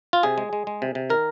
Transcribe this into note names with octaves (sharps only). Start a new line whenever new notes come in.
F4
C3 G#4
G#3
G#3
G#3
C3
C3
D#3 A#4